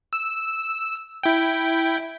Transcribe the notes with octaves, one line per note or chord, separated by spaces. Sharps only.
E6
E4 G5